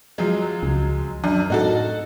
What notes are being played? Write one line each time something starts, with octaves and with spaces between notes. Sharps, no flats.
F3 F#3 G#3
C#2
F#2 D4
A2 D#4 F#4 A4